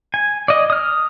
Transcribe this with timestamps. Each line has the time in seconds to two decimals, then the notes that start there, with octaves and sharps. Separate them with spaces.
0.14 G#5
0.48 D5 D#5
0.70 D#6 F6